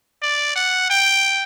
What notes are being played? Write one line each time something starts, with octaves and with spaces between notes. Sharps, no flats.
D5
F#5
G5